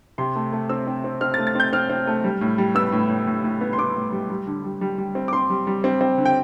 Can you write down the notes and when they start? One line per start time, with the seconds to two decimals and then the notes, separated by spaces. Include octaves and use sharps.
0.18 C3 C6
0.35 A3
0.53 A3
0.69 C4 E6
0.87 C4
1.04 C4
1.21 C4 F6
1.34 A6
1.38 A3
1.47 A6
1.55 C4 G6
1.73 C4 F6
1.90 C4
2.07 A3
2.24 G3
2.41 A2
2.58 G3
2.75 B3 E6
2.92 A2
3.10 A2
3.27 A2
3.44 A2
3.61 B3
3.73 C6
3.78 B3 D6
3.95 A2
4.12 G3
4.30 G3
4.47 D3
4.64 G3
4.81 G3
4.98 G3
5.15 C4
5.28 D6
5.33 C4 C6
5.50 G3
5.67 G3
5.84 C4
6.01 C4
6.18 D3
6.25 G5